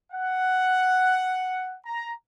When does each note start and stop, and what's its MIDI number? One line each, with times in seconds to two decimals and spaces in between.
0.12 1.76 78
1.86 2.12 82